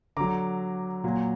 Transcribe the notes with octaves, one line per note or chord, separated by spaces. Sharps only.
D3 F#3 A#5 D6
A#2 F#3